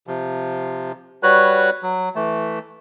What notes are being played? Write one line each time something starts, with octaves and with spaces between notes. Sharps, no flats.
C3 F3
G3 F#4 B4 C#5 F#6
F#3
E3 A3